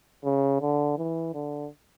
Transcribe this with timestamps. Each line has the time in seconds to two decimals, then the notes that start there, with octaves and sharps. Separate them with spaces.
0.24 C#3
0.61 D3
0.98 E3
1.34 D3